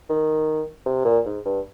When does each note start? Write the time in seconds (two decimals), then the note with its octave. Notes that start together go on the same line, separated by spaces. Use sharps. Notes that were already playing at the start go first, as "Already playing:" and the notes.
0.09 D#3
0.86 C3
1.05 A#2
1.26 G#2
1.46 G2